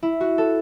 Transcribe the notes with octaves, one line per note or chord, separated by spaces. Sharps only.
E4
F#4
A4